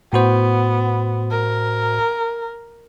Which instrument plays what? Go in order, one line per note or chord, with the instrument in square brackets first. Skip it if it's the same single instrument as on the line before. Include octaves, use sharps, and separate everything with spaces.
[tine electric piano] A2 F#4 C5 [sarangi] B3
[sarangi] A#4